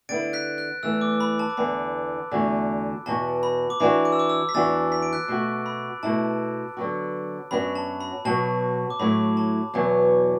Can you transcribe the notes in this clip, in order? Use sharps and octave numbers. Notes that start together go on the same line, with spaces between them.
D3 B3 E4 A6 D7
F#6 B6
F#6
E2 E3 A3 E6
D6
B5
A5
D6
E2 D3 B3 B5
E2 D3 A3 F#4
E2 B2 B3 F#4 A5
B5
D6
E3 D4 F#4 B5
D6
E6
D6
E6
B6
E2 E3 D4 F#4 E6 A6
B6
D7
F#6 B6
B2 A3 F#4
B5
B2 A3 E4 A5
D3 F#3 B3 F#4
F#2 F#3 B3 D4 F#4 B5
A5
B5
B2 F#3 B3 F#4 A5
D6
A2 F#3 A3 E4 B5
A5
E2 B2 F#3 B3